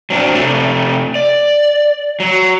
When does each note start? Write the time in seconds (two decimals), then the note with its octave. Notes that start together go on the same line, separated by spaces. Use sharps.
0.10 F#3 C4 D4
0.34 C3 A3
1.15 D5
2.20 F#3